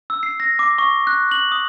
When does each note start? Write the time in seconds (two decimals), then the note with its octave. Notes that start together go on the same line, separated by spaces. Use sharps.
0.10 E6
0.23 C7
0.40 A#6
0.59 D6
0.78 C#6
1.07 F#6
1.31 F#7
1.52 D#6